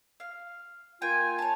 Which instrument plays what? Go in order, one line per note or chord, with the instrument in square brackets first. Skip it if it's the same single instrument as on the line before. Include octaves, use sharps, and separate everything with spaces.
[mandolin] F5
[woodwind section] A#3 F4 G#5 [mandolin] G5
[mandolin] C#5 A5